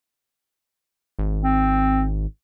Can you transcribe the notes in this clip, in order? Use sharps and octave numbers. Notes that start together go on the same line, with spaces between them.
G#1
C4